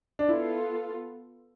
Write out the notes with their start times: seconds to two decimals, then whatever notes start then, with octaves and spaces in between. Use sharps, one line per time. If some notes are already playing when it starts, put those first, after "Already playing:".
0.19 D4
0.28 B3 E4 F4 A4